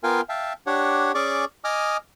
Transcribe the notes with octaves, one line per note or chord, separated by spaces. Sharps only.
B3 F4 A#4 F5 G5 G#5
E5 F5 G5 A5
D4 G4 C#5 F#5
C#4 G#4 D5 C#6 D6
D#5 G#5 D6 D#6 F6